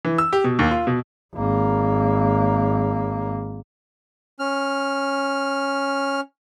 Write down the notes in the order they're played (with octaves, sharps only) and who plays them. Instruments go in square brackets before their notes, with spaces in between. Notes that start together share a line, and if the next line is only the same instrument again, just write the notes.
[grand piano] E3
E6
G4
B2
D#2
F4
B2
[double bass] G#1 A#3
[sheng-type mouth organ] C#4 F6